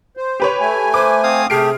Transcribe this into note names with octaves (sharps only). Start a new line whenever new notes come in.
C5
G4 B4 C#5
A3 G#5
B4 C5 D6
C4 F5 D#6
C3 A3 G4 G#4 F6 C7 D7